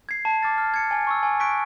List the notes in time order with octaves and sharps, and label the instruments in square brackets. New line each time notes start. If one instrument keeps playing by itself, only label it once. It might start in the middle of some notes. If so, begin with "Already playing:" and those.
[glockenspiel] G#6 C7
A5
D6 F6 A6 C#7
F6
G#6 C#7
G#5
C#6 E6
G#5
C#6 F#6 B6 D7